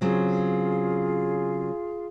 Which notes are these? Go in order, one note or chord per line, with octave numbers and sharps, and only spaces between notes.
C#3 F#3 C4 F4 G#4 F5